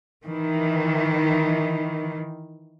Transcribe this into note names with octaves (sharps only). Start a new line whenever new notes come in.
D#3 E3